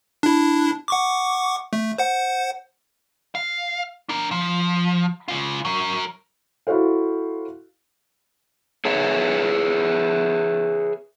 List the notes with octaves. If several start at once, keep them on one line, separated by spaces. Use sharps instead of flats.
D4 E4
F#5 C#6 D6
A3
C5 F#5
F5
D4 A#4
F3
C#3 F4
F#3 A#4
E4 F#4 A4 C5 F5
G#4 B4 C#5 E5